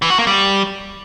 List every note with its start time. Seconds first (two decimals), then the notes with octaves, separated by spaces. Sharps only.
0.02 E3
0.10 F#4
0.19 A#3
0.27 G3